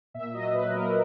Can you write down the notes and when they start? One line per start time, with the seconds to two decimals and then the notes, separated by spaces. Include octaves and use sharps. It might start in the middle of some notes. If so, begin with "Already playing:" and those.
0.14 A#2 E5
0.34 F#3 D#5
0.54 A#2 B4
0.74 A#3 A#4